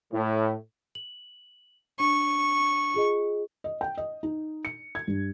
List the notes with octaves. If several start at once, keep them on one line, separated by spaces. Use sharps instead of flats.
A2
F#7
D4 C#6
F4 G#4 D#5
D#5
G5
D#5
D#4
C#7
G#6
G2